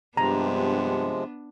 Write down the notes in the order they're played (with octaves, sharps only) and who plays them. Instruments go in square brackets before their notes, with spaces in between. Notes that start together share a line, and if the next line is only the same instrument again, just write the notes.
[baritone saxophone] G2 [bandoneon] C3 F3 G#3 [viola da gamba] B3 D4 [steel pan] A#5